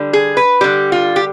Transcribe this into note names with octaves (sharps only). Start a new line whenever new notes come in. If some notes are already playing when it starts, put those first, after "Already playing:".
Already playing: D3 G3
G#4
B4
D3 G3 G4
F4
G4